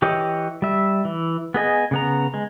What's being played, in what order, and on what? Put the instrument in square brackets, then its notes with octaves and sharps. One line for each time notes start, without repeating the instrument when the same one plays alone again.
[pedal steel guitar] E3 G4 C#5 D#5
G3 E5
E3
B3 G#4 D#5 G#5
C#3 B3 A#5
G#3